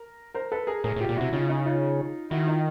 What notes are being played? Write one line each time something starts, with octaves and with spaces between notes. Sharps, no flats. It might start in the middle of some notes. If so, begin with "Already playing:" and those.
Already playing: A#4
A#4 C5
A4 B4
G#4 A#4
A2 G#4 A#4
A2
F4 G4
A#2
C3 E4 F#4
C#3 D#4 F4
C#4 D#4
D#4 F4
D#3 E4 F#4
D#4 F4